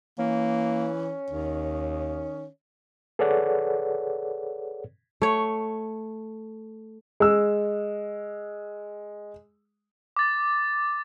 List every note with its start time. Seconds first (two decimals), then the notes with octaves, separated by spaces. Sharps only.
0.19 E3 A#3 C#4
1.30 D#2 D#3
3.19 G#4 A4 B4 C#5 D5 F#5
5.22 A3 C#5
7.20 G#3 E6
10.17 D6 A6